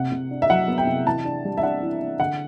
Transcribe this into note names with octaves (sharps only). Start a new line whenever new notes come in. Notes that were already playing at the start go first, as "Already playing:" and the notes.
Already playing: C3 F#5
C3
D4
E5
F#3 F#5
B3
G5
C3
E3 A5
D4
G3
E5
D4 F#5
E3
D4
D3 F#5